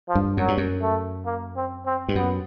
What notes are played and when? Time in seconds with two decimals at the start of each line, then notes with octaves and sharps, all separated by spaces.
0.09 F3
0.15 G2
0.37 F#2 F#3
0.48 G2
0.57 F#2
0.82 A3
1.26 A#3
1.56 C4
1.86 C4
2.09 G2
2.15 F#2 B3